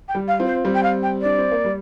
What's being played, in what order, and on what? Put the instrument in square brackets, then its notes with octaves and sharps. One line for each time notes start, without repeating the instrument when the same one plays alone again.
[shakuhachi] G5
[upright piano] G3
[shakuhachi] F5
[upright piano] C4 F4
[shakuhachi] C5
[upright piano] G3 C4
[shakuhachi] G5
F5
G5
[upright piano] D4 [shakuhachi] D5
[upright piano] C4
A#3
G3